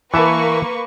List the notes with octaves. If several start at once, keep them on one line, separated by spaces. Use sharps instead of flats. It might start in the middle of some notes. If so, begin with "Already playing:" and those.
E3 A#3 B4 E5 A5 C#6